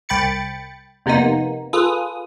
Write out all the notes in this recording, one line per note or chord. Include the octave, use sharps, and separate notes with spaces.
C2 G5 B5 A6 C#7
F2 C3 A#3 B3 D#4
F4 G#4 A4 B4 D#6